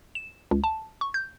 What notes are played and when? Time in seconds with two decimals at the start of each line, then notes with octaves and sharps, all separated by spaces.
0.15 E7
0.51 C#2
0.64 A5
1.01 C#6
1.14 G6